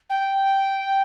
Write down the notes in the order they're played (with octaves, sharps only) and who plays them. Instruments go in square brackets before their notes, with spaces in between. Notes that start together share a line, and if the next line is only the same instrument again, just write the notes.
[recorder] G5